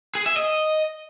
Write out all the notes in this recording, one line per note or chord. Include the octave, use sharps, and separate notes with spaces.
G#4
E5
D#5